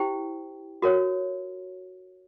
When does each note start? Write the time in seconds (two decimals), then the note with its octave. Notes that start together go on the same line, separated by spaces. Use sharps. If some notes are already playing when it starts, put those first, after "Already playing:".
Already playing: E4 G4 C5 G5
0.82 F#4 A#4 C#5